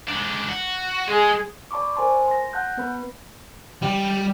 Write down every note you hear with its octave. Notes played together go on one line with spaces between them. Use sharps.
G#2 D4
F#4
G#3 G#4
D5 A5 B5 C#6 D6
A#4 C5 G#5 A5 C6
C6 A#6
F#5 A5 F#6 G6
B3 B4 B5
G3